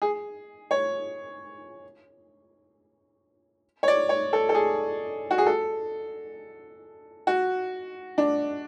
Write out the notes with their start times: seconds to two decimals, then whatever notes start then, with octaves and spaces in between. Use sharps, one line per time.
0.02 G#4
0.71 C#5
3.83 C#5
3.88 D5
4.09 C#5
4.33 A4
4.49 A4
4.55 G#4
5.31 F#4
5.38 G#4
5.46 A4
7.27 F#4
8.18 D4